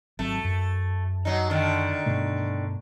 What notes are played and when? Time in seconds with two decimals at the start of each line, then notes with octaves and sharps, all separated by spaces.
0.19 G#1 F#3 A3 C4
0.44 F#2
1.25 F#3 D#4
1.50 D3 D#3
2.06 G2 B2 A3